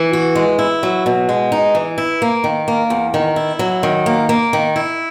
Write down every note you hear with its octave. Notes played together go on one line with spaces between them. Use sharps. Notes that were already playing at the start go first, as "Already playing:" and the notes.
Already playing: E3
F#4
G#3
E4
F#3
B2
G#3
D#4
E3
E4
A#3
D#3
A#3
E2
D#3
E4
F#3
D#3
A#3
A#3
D#3
E4